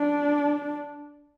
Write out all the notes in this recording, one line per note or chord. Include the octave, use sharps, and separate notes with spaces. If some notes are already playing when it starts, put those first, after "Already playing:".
Already playing: D4